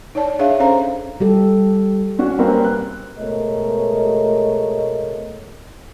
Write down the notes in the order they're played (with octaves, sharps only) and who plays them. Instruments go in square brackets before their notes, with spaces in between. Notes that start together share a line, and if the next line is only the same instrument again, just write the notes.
[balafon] D#4 C#5 D5 A5
D4 G#4 C#5 E5 F5
C#4 A4 C5 F5 A#5
[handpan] G3 G4 A4
[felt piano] C#4 D4 F#4
G3 A#3 C4 C#4 A#4 B4
F#6
[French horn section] B2 G#3 A3 A#4 C#5 D#5